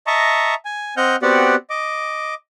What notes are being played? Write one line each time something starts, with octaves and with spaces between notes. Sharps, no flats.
D#5 E5 A5 A#5 C#6
G#5
C4 D#5 F#5 F6 G6
B3 C4 F#4 G4 D5 F#5
D#5 D6